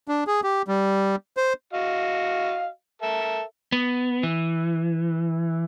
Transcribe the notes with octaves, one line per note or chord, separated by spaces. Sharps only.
D4
G#4
G4
G3
C5
F#4 D#5 F5
A4 A#4 E5
B3
E3